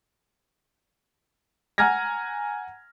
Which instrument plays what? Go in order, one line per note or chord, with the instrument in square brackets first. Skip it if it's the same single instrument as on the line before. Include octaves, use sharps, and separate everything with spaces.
[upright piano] F#5 G#5 A#5 F6 G#6 A#6